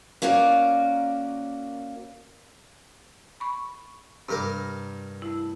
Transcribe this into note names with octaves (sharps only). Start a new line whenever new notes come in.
A#3 C#4 F#4 A#4 D5
B5 C#6
G2 C3 A#4 D6
A3 E4